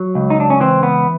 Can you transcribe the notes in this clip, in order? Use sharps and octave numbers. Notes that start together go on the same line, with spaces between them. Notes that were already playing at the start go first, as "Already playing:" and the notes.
Already playing: F#3
C#2
D#4
D4
C#4
E3 C4
B3